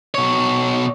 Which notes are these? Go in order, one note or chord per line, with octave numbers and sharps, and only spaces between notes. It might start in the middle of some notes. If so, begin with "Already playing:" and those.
B2 C#5